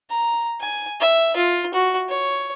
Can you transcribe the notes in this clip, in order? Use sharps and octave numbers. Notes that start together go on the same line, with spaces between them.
A#5
G#5
E5
F4
F#4
C#5